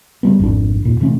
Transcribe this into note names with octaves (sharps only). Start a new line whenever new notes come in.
C#3 F#3 G3 B3
G#1 F2 D4
E1 A#2
C3 E3 A3 C#4